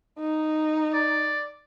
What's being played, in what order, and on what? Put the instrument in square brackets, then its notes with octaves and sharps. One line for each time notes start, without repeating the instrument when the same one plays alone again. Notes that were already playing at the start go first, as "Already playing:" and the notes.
[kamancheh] D#4
[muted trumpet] D5